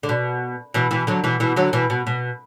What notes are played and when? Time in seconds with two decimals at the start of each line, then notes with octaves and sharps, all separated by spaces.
0.03 D3
0.09 B2
0.74 B2 E3
0.91 B2 E3
1.07 D3 F#3
1.24 B2 E3
1.40 B2 E3
1.56 D3 F#3
1.73 B2 E3
1.90 B2
2.07 B2